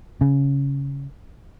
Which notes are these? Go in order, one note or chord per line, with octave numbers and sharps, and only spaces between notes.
C#3